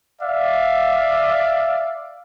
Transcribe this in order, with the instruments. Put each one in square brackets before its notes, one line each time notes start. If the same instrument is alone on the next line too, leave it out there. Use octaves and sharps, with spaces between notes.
[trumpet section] D5 E5 F5